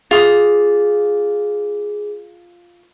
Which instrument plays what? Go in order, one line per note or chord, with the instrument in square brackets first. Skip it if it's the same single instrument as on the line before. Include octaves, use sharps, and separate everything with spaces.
[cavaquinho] F4 D#6 [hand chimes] G#4